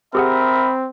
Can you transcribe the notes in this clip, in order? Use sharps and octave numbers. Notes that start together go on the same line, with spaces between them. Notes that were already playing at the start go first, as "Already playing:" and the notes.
C4 G4 G#4 A#4 E5 F#5 B5 D#6